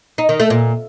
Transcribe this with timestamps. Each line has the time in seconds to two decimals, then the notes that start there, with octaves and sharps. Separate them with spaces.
0.18 D#4
0.29 D#3
0.40 A3
0.50 A#2